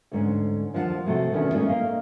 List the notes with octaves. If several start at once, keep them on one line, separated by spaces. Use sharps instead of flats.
D2 G#2 C#4
D#2 F3 D#4 F#5 A5
A2 C3 A3 F#4 D#5 G5
E2 B2 D#3 C#4 E4
A2 G#3 A#3 C#4 D#5
A#3 D#5 F5